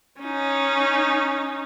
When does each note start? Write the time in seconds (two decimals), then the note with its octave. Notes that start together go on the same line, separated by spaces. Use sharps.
0.21 C#4 D#4